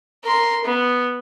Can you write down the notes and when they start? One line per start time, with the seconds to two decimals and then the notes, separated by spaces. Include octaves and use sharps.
0.24 A#4 C6
0.65 B3